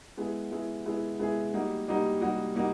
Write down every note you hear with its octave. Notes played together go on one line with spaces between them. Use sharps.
G#3 B3 E4 G#4
G#3 B3 E4 G#4
G#3 B3 E4 G#4
G#3 B3 E4 G#4
G3 A#3 D#4 F#4
G3 A#3 D#4 F#4
G3 A#3 D#4 F#4
G3 A#3 D#4 F#4